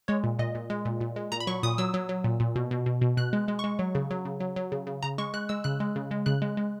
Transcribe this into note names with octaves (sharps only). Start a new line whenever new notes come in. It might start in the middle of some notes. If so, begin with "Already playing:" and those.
G#3 C#5
A#2
A#2 D#5
A#2
G#3
A#2
A#2
G#3
A#2 A#5
B5
F#3 C#6
A#2 D#6
F#3 E6
F#3
F#3
A#2
A#2
B2
B2
B2
B2
B2 F#6
G#3
G#3
G#3 C#6
F#3
C#3
F#3
C#3
F#3
F#3
C#3
C#3
C#3 A#5
G#3 C#6
G#3 F#6
G#3 E6
C#3 F#6
G#3
C#3
G#3
C#3 F#6
G#3
G#3